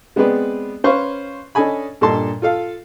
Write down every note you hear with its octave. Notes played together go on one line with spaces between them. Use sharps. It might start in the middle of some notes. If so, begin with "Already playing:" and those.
G#3 B3 C4 G#4 B4 D5
C#4 B4 C5 F5 C#6
C#4 D4 A4 D#5 G#5 B5
G2 A#2 A4 D#5 A5 C6
F4 A4 F5